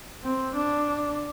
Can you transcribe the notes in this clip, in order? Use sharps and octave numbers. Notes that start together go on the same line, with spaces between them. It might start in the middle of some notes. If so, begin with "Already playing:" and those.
C4
D4